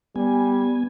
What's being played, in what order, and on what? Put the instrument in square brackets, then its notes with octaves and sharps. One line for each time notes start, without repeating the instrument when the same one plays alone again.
[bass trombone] G3 [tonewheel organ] B3 G#5